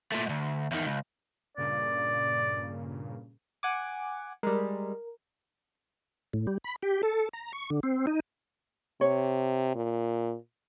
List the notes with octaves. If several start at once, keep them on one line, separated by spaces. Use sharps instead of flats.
A#2 A3
D2 G#2
E2 D#3
C#2
G2 A#2 C#3 D5
F#5 G#5 D6
G3 G#3 A#4
A2
G3
B5
G4
A4
A#5
C#6
D3
C4
D#4
C3 C#5
A#2